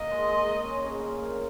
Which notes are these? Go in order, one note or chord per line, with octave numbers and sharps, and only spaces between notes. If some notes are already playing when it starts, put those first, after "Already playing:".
Already playing: A#3 D#5
G#3
G#3
C#4
C#3
A#2
A#2